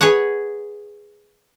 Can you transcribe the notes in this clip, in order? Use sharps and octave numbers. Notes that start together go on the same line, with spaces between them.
G#4 B4 C#5 F#5